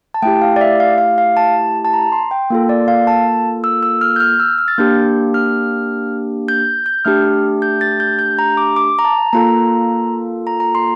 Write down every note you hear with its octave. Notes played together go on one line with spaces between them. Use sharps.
A5
A3 E4 G4 G5
F5
D5
E5
F5
F5
F5
A5
A5
A#5
C6
G5
A#3 F4 A4
D5
F5
A5
E6
E6
F6
G6
F6
E6
F6
A6
A#3 D4 G4 G6
F6
G6
G6
A3 D4 G4 F6
G6
A6
G6
G6
A#5
D6
D6
A#5
A5
A#3 F4 A4 A#5
A#5
A#5
C6